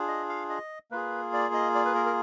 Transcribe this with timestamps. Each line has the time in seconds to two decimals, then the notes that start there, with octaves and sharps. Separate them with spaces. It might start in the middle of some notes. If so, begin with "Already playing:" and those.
Already playing: D4 F4 G#4
0.08 D#5
0.29 F5
0.50 D#5
0.91 A#3 F4 G#4 B4
1.33 D5
1.54 D#5
1.75 D5
1.85 B4
1.95 A#4
2.06 A#4